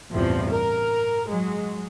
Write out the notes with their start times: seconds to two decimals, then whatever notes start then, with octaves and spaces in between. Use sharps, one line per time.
0.12 A1 E2 G2 C3 F3
0.51 A#4
1.28 F#3 G#3